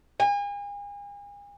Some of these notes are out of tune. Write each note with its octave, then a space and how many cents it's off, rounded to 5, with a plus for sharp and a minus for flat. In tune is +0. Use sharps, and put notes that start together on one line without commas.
G#5 -40